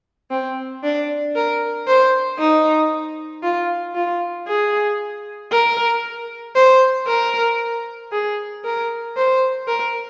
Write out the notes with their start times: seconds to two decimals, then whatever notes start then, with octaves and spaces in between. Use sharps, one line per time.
0.31 C4
0.84 D4
1.36 A#4
1.88 C5
2.39 D#4
3.43 F4
3.95 F4
4.48 G#4
5.51 A#4
6.55 C5
7.07 A#4
8.12 G#4
8.65 A#4
9.17 C5
9.67 A#4